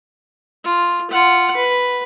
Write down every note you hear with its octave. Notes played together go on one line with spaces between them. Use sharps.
F4
F4 F#5
B4